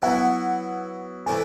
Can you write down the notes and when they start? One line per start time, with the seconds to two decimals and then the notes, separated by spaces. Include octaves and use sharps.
0.02 F#3 B3 E4 F#5
1.26 C3 E3 A3 D4 G#5